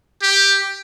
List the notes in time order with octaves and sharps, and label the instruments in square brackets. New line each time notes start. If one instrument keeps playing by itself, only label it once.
[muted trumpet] G4